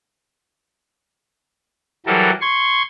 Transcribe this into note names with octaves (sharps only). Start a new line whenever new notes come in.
E3 F#3 G3 A4 A#4
C6 C#6 G#6